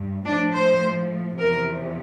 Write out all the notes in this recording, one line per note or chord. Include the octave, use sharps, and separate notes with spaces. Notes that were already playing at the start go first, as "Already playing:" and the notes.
Already playing: G2
A2 F3 D4
C5
E2 C3 F3 A#4